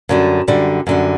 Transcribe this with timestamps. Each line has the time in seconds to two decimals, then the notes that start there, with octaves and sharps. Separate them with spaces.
0.09 F#2 D3 G3
0.48 F#2 D3 G3
0.87 F#2 D3 G3